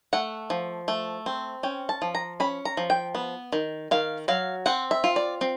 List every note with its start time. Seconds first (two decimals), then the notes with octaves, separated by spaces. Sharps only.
0.13 A3 F#5
0.50 F3
0.88 A3
1.26 C4
1.63 C#4 G5
1.89 A5
2.02 F3
2.15 A#5
2.40 C#4 B5
2.65 A#5
2.77 F3
2.90 G5
3.15 B3
3.52 D#3
3.91 D#3 F5
4.28 F#3 F5
4.66 C4 F#5
4.91 E5
5.04 F4
5.16 D5
5.41 C4